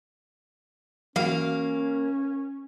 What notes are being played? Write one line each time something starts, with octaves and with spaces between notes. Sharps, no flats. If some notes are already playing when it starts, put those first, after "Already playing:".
E3 F#3 A#3 C#4 F#4 F5